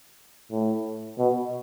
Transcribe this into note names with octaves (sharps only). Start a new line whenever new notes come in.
A2
B2